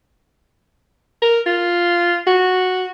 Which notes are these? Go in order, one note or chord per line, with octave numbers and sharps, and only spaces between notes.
A#4
F4
F#4